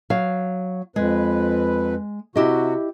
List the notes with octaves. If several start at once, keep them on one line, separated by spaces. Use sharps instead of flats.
F#3 F5
F2 G#3 B4
C3 E4 F#4 G4 D#5